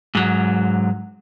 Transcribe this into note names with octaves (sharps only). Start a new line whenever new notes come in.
G#2 F#3